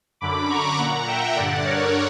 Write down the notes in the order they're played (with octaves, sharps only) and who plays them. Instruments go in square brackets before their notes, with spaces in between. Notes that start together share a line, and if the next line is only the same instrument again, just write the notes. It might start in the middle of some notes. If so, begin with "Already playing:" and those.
[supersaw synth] F#2 D3 B5 D6
A#5 C#6
A#2 F#5 A#5
E5 G5
G2 D3 D5 F#5
A#4 C#5